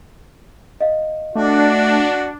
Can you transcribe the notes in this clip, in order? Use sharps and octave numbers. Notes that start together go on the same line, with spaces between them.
D#5 F5
A3 D4 F#4 D5